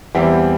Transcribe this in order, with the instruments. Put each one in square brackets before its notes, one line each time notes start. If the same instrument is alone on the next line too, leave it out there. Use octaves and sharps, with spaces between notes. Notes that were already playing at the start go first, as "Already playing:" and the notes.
[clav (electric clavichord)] E2 [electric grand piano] G3 C4 E4 G4